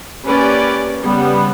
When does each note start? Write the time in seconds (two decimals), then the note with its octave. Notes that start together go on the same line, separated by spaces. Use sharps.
0.25 A#3 C#4 G4 B4 D5
1.03 C#3 G3 B3